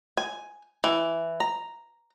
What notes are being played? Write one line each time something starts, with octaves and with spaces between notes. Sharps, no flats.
G#5
E3
A#5